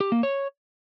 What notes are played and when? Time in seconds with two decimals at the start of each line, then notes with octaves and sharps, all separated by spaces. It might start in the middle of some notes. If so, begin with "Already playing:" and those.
0.01 G4
0.12 A#3
0.23 C#5